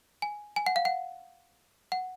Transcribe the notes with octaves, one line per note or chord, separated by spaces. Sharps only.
G#5
G#5
F#5
F5
F#5
F#5